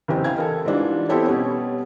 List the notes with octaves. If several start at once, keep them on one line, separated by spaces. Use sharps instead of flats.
F#1 E2 C3 G5
E4 F5 G5 G#6
A4 A#4 D#5
G#2 E3 G3 D4 F4
B3 C4 E4 G4 A4 C#5
B2 G3 C#4